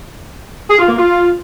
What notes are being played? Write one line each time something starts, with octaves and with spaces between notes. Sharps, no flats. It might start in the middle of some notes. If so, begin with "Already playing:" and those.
G#4
F4
A#3
F4